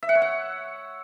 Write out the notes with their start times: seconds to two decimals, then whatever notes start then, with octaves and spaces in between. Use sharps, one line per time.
0.03 E5
0.09 F#5
0.15 C#5
0.22 F#5